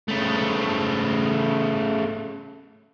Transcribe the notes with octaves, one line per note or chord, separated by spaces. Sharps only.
C#3 A3